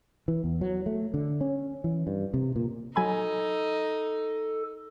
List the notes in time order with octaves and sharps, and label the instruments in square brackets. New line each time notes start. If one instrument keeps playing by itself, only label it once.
[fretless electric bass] E3
E2
F#3
A3
D3
C#4
E3
G2
C3
A#2
[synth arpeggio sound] F#3 G#5 B5 [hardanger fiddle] D#4 [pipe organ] A4